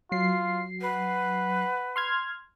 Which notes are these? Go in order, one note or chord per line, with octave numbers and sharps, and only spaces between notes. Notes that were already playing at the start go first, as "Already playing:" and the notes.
F#3 F4 C7
B4 F#5
C6 F6 G#6